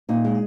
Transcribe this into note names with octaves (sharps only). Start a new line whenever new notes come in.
A#2 D#4
G#3